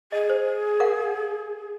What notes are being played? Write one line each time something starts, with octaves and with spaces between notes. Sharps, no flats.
G#4 D#5
C5
A#4 F5 F#5